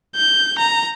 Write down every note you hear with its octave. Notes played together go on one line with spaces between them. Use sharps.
G6
A#5